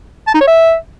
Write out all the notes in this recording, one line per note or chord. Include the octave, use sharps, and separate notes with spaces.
A5
D#4
C#5
E5